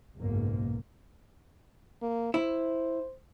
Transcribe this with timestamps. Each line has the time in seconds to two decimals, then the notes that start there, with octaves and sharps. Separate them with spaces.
0.17 F#1 B1 G#2 A#3
2.02 A#3
2.34 E4 C5